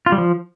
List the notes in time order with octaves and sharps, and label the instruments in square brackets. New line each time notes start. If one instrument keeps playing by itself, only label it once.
[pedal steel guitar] F4
G3
F3